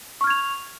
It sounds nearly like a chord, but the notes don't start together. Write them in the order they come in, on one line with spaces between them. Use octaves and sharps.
C#6 F6 G#6 F7